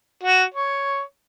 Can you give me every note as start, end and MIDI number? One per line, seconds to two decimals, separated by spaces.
0.23 0.44 66
0.54 1.01 73